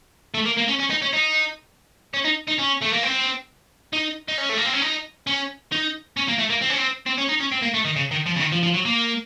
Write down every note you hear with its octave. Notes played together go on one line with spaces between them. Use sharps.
A3
A#3
A#3
C#4
C#4
D#4
C#4
D#4
C#4
D#4
D#4
C#4
A3
A#3
C4
D#4
D#4
C#4
A3
A#3
C4
C#4
D#4
C#4
D#4
C#4
A#3
A3
A#3
C4
C#4
C4
C4
C#4
D#4
C#4
C4
A#3
A3
D#3
C#3
D#3
F3
C#3
D#3
F3
F3
F#3
A#3